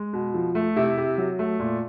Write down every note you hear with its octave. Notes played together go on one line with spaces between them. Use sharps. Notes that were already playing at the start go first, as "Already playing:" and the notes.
Already playing: G#3
B2
F3
A3
C3 E4
C3
F#3
A3
A#2